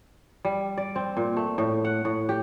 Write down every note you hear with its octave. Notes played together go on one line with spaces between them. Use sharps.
G3
D5
C4
A#2
A3
A2
F#5
A2
G4